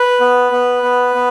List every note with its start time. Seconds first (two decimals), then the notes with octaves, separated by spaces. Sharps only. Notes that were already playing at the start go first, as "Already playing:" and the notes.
Already playing: B4
0.20 B3
0.52 B3
0.83 B3
1.15 B3